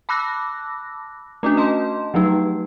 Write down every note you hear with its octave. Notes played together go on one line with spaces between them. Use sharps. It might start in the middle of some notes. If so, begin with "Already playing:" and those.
A5 B5 D6 E6 F#6 A#6
A3 C#4 D4 F#4
D#5 A5 C6
F3 F#3 A3 D#4 B4